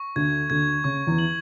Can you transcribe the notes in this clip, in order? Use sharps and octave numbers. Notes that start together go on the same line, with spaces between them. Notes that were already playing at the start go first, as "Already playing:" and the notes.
Already playing: C#6
D2 D3 G#6
D2 D3 G#6
C#3 C#6
E2 E3
F#7